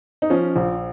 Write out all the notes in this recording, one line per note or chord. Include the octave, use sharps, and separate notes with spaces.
D#4
F3 C#4
A#1